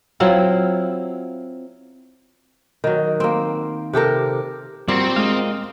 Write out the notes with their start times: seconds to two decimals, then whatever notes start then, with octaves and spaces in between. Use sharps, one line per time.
0.20 F#3 C4 E4 F4
2.84 D#3 F#3
3.20 A#3 C4
3.93 C3 G4 A4 A#4
4.88 A#2 G3 C4 F#4
5.16 G#3 D#5 F5